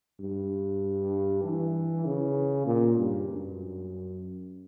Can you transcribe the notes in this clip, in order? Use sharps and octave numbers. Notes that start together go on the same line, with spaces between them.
G2
E3
C#3
A#2
G2
F#2